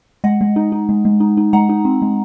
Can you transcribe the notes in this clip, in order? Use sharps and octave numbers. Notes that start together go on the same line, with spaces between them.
G#3 D#5 F#5
G#3
D#4
D#4
G#3
G#3
D#4
D#4
G#3 F#5 A#5
D#4
C4
G#3